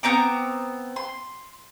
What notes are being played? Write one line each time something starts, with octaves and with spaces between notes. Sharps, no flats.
B3 C4 A#5 D6
C6